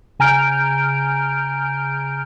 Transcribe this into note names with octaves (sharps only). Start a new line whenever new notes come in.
C#3 G#5 A#5 F6 G6 D7